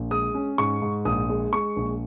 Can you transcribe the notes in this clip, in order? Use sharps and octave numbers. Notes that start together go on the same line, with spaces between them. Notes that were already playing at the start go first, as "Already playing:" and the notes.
Already playing: A#1
G#3 D#6
C#4
G#2 C#6
G#2
A#1 D#6
G#3
G#3 C#6
A#1